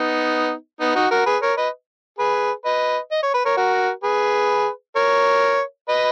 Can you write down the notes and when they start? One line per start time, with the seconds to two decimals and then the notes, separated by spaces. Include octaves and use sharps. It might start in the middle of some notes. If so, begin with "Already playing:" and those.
Already playing: B3 D#4
0.81 B3 D#4
0.95 D#4 F#4
1.11 F#4 A#4
1.26 G#4 B4
1.42 A#4 C#5
1.57 B4 D#5
2.19 G#4 B4
2.65 B4 D#5
3.11 D#5
3.23 C#5
3.34 B4
3.45 A#4 C#5
3.57 F#4 A#4
4.03 G#4 B4
4.96 A#4 C#5
5.88 B4 D#5